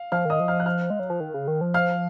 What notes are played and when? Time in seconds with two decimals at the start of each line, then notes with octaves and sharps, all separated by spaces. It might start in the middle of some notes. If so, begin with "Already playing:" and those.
Already playing: F5
0.12 F3 F5 F6
0.25 D#3 D#5 D#6
0.40 F3
0.48 F5 F6
0.60 F#6
0.66 F5 F6
0.90 G#3
0.99 F#3
1.10 F3
1.20 D#3
1.34 C#3
1.48 D#3
1.61 F3
1.74 F5 F6